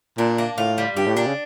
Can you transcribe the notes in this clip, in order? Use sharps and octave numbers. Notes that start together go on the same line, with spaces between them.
A#2 D4
A#3
A2 F4
G3
G2 G4
A2
A#2 D4
C#3